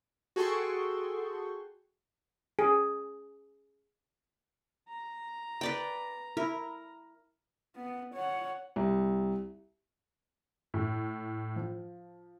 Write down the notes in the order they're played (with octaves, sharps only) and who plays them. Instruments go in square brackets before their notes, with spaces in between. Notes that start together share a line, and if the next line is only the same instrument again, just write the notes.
[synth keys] F#4 G#4 A4 G5 C6 C#6
[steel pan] G#4
[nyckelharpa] A#5
[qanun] B4 D5 G5
[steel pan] E4 [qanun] A#4
[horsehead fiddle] B3
C#5 F#5
[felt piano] C2
[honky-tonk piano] A2
F3